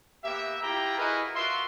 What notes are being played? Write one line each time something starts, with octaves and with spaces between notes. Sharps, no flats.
A#3 B3 G4 E5
E4 F4 G4 G5 A#5
E4 F#4 G#4 A#4 B4 D#5
F4 F#4 A#4 E5 C6